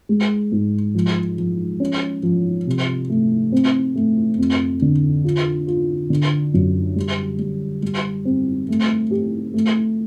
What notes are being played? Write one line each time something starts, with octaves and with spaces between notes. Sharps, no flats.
G#3
G#2
F3
F3
C#4
F3
C3
A3
C4
A3
F2
D3
F4
F4
D3
F#2
G3
G3
G3
C4
A3
G4
A3